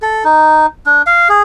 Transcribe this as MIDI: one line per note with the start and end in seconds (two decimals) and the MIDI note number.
0.02 0.24 69
0.24 0.66 63
0.86 1.02 62
1.07 1.28 77
1.29 1.43 68